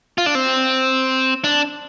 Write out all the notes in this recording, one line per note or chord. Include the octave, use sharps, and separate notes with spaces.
F4
D4
C4
D4